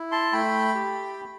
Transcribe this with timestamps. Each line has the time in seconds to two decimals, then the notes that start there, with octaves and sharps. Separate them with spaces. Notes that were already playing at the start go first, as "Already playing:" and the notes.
Already playing: E4
0.12 A5 C6
0.32 A3 G5 B5
0.75 G4